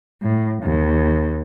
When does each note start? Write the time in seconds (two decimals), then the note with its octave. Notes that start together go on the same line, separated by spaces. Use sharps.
0.22 A2
0.63 D#2